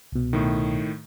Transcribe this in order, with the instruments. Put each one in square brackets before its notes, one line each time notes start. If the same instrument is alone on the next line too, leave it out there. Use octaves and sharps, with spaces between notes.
[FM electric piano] C2 B2
[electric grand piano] A2 D#3